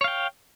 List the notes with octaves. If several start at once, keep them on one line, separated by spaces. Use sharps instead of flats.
C#5 F5 G5